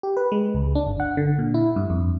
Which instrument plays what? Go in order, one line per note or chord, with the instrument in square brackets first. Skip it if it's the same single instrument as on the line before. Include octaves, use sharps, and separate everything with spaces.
[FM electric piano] G4
B4
G#3
C#2
D4
G1
F#5
D3
A#2
E4
G2
F2